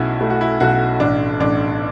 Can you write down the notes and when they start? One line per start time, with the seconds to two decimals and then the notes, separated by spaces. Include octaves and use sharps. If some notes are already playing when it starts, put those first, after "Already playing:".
Already playing: B1 C#4 E4 F#4
0.21 A3 E4
0.30 F#4
0.41 E4
0.60 B1 F#4
1.00 A1 D4
1.40 A1 D4